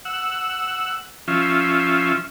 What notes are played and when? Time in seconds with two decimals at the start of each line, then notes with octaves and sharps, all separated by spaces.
0.05 F#5 E6
1.28 F3 C#4 F4 E5